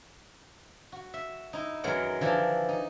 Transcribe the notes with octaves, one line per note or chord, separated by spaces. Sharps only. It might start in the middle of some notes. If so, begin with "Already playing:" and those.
F#4
E5
D#4 E4
F#2 E3 F#3 G#3 A#4 F#5
D3 E3 F3 D4
D#4